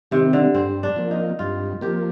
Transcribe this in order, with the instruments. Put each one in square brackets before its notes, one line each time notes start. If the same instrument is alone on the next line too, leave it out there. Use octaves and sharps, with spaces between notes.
[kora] C3 [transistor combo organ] D#3 G3 C4
[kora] D3
[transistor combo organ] G2 [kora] C4
[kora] D4
[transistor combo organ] F3 A#3
[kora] D#4
[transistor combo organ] G2 [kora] F4
[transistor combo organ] F3 A#3 [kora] G4